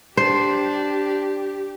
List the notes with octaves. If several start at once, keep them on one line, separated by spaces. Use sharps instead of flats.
D4 G4 C5